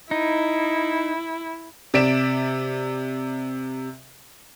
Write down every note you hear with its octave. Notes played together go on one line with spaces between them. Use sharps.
D#4 E4
C3 D5 B6 D7 E7